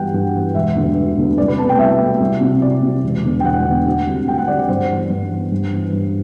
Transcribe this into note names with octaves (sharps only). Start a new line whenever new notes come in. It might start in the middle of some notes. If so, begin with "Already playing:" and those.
Already playing: G2 E3 G3 B3 F#5 G5
G2
E3 G3 B3
E1 E5
D2 D3 F#3 B3
E1
D2 D3 F#3 B3
C2 D5
B4
B2 A3 C4 A5
G5
C2 E5
B2 A3 C4
C2
C3 F#3 C4
C2 D5
C3 F#3 C4
E1
E2 D3
G5
E1 F#5
E2 D3
D2
D3 G3 C4
D2 G5
F#5
D3 G3 C4 D5
D5
G2 C5
E3 B3
G2
E3 B3
G2
E3 B3
G2